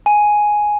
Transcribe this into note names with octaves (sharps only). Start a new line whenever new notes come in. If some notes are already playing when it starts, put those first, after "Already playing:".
G#5